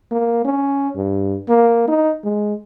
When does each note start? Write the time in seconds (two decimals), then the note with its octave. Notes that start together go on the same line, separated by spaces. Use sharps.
0.12 A#3
0.45 C#4
0.96 G2
1.49 A#3
1.88 D#4
2.24 G#3